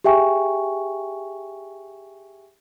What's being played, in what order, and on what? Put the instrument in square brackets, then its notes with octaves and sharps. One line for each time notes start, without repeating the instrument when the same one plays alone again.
[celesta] G4 G#4 E5 G5 G#5 C#6